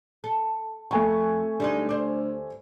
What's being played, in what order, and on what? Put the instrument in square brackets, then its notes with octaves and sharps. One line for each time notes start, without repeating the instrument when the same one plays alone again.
[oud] A4
[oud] F2 [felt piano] A3 G#5 C#6
[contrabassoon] D2 [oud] G3 G#3 D#4
[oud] C5 D5